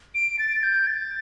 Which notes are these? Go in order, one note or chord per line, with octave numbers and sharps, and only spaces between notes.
D7
A6
G6
A6